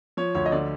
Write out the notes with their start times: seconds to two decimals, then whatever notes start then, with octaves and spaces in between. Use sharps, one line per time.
0.17 F3 C#5
0.35 D2 C#5
0.46 D#5
0.52 D3 D5